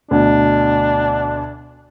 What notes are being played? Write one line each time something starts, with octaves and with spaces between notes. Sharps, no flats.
D2 B2 D4